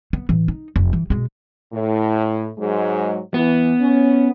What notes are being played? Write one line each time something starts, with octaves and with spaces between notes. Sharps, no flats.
B3
A2 E3
D#4
F1
E3
B2 G#3
A2
G#2 F#3 G#3
E3 B3
C#4